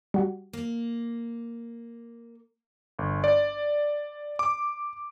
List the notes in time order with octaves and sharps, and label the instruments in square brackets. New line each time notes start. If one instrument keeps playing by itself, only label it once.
[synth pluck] G3 F#4
[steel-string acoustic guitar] A#3
[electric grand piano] G1
D5
D6